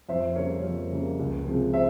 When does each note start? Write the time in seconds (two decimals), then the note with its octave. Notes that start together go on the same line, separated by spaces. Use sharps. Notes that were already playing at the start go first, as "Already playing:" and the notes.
0.09 F2 C5 E5
0.36 C#3 G3 A#3 A#4 C#5
0.65 F2
0.91 C#3 G3 A#3
1.19 C#2
1.46 C3 F3 G#3
1.74 C5 E5